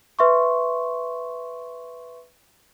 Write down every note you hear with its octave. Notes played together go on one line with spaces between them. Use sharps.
B4 E5 C6 C#6